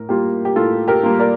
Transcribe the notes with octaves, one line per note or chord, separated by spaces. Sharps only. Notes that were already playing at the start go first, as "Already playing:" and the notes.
Already playing: A2 A#4
G3 A#3 F4 G4
G4
A2 F4 A4
G4 A#4
G3 A#3 F4
A#4 D5